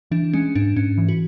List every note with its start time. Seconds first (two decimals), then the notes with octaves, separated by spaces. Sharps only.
0.11 E3 D4
0.33 G#3 C#4
0.55 G#2 D4
0.76 G#2 C#4
0.98 E3
1.08 F#4